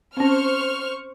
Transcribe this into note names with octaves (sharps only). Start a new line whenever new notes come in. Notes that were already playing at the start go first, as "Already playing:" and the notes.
C4 C#4 C5 C#6 F6